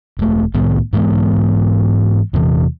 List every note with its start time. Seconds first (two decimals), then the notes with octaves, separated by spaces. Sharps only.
0.19 E1 A3
0.54 C2 A2 D#3 B3
0.93 G#2 E3 G#3 B3
2.33 E2 C3 E3